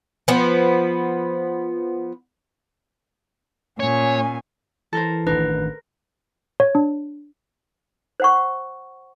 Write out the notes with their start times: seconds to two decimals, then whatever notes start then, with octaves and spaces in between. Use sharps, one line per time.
0.28 F3 B3
3.80 A#2 C#4 C#5 G#5
4.93 E3 A4 A#4 C5
5.27 A1 D#3 D4 A#4 B4
6.60 C#5
6.75 D4
8.20 C5 F#5 C#6